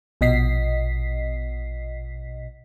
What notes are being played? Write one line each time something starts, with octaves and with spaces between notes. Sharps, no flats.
A#1 B2 D#5 B6 C7